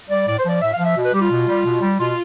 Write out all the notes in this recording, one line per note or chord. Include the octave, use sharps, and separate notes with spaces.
G3 D5
A2 D5
C5
F3 D5
A2 E5
F5
F3
E5
B2
B4
G3 G4
F4
B2
G3
B2
G3
B2 F4